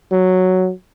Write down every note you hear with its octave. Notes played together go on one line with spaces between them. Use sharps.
F#3